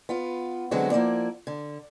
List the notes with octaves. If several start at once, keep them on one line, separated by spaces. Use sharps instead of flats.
B3 F4
D3 F#3 G#3 B3 C4 F#4
F3 A#3 E4 D5
D3